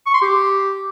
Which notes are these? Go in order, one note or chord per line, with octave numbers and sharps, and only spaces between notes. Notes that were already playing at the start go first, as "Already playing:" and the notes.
C#6
C6
G4